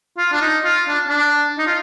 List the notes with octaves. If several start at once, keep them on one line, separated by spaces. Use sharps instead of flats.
F4
D4
D#4
F4
D4
D4
D#4
F4